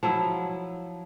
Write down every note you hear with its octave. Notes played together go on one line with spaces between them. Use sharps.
F3 F#3 E4